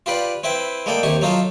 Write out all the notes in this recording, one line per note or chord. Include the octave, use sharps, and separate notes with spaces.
F4 G4 B4 D5
C4 E4 B4 G5
G#3 A#3 A4 D5 G5
D#2 C3 G4 C#6
F#3 D#4 F4 A4